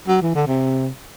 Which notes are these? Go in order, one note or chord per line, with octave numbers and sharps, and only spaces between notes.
F#3
E3
D3
C3